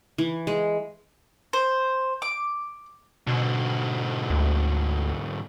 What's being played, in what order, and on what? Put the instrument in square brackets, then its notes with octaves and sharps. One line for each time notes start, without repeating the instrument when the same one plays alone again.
[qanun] E3
G#3
[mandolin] C5
D6
[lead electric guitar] G#2 D3 [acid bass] B2
[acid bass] D2